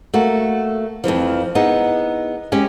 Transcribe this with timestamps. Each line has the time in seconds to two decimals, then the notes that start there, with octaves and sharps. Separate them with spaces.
0.14 A3 A#3 F#4
1.04 F2 G#2 E3 F3
1.55 B3 D#4 E4 G#4
2.52 G#3 C#4 G4 G#5